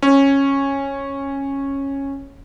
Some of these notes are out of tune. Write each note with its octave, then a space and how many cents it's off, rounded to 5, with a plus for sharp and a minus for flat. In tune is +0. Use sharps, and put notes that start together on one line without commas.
C#4 -10